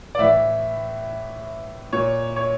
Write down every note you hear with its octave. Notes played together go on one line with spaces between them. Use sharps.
D5
A2 E3 E5
A#2 C#5
C#5